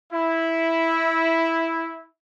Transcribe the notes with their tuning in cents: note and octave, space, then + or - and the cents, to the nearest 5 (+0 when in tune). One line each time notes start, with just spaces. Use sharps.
E4 -5